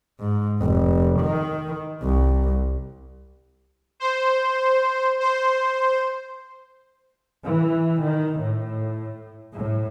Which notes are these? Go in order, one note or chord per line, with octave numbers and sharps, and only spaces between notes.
G#2
F1
D#3
C2
C5
C5
E3
D#3
A2
A2